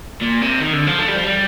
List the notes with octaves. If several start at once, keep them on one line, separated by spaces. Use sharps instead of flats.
A#2
C3
D#3
D3
F3
A3
G3
F3
G3